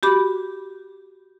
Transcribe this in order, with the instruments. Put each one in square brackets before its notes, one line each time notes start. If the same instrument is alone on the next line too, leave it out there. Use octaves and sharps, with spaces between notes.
[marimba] F#4 G4 B5 D6